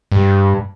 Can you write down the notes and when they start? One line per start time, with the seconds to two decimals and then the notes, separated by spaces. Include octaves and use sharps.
0.12 G2